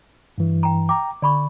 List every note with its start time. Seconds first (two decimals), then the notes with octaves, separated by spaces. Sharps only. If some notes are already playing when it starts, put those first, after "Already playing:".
0.38 G2 E3
0.63 G5 A#5
0.89 G5 A#5 D6
1.22 D3 D5 B5 C#6